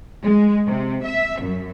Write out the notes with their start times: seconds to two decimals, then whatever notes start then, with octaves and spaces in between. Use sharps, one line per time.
0.24 G#3
0.67 C3
1.03 E5
1.40 F#2